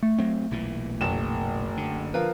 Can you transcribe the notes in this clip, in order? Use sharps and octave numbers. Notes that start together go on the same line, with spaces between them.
A3
F#3 C4
B1 A#2 E3
F#1 E7
D3
F3 A#4 B4 F5